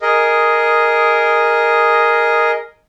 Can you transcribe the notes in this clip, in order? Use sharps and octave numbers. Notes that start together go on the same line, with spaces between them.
G#4 A#4 D#5